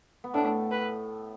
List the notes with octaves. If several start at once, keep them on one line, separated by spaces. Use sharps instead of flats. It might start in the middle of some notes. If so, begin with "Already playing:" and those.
B3
A2 A3 D4
B4